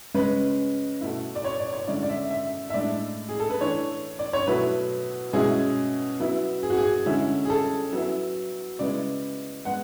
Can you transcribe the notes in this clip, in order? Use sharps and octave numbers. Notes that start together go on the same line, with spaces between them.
C#3 G#3 C#4 B4
B2 A3 E4
D5
C#5
D5
C#5
D3 G#3 C#4 E4 D5
D5
E5
E5
E5
A2 G#3 D4 D5
G#4
A4
B4
E3 A3 D4 C#5
D5
C#5
B2 F#3 A3 E4 B4
B2 G#3 C#4 E4 G#4
F#3 B3 E4
G#4
F#4
G#4
D3 G#3 C#4 E4
G#4
A4
F#3 B3 E4
C#3 G#3 B3 E4 D5
G#3 B3 F#5